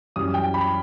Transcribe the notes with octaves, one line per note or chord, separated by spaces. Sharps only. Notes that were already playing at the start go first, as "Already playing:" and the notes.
F#2 E3 G3 D#6
G5
B5